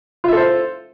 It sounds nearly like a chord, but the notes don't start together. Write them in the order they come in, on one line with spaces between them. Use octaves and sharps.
F4 E5 A4 C5